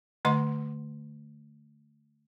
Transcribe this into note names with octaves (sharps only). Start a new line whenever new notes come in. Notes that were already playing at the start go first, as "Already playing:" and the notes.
D3 A3 D#5 F#5 C6